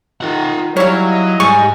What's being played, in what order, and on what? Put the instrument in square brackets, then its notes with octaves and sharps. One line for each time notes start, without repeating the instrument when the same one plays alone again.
[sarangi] D#3 [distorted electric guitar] F4 F#5
[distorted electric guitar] F#3 [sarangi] G3 [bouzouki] E4 F5 [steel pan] C#5
[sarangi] D#5
[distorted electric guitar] G#2 [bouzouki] G3 G#5 [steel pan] C#6